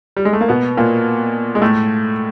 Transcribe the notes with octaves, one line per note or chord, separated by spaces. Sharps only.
G3
G#3
A3
A#3
B2 B3
A#2 A#3
G#3
A2 A3